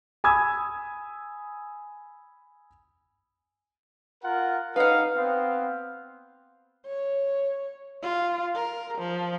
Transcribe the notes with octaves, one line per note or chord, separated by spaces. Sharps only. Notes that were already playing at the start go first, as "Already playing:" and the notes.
G#5 B5 D#6 E6 G#6
F4 A#4 F#5
D#4 B4 F5 F#5
B3 C4 F5
C#5
F4
A#4
F3